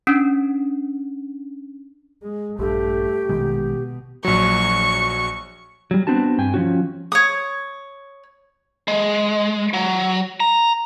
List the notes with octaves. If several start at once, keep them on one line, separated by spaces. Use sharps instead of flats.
C#4 D4
G#3
A#1 G2 A3 G4
A#1 B2 D#3 G#3
A#1 F#3 C#6
F#3 G3
B3 C4 D4 F#4 A5
G2 G5 G#5
F3 G3 C#4 F#4
C#5 D#6
G#3
F#3
A#5